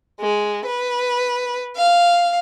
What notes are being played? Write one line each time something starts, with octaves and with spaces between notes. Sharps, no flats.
G#3
B4
F5